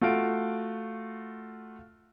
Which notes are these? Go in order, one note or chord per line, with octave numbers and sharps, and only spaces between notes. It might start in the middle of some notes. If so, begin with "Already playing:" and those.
A3 F4 F#4 F5 D7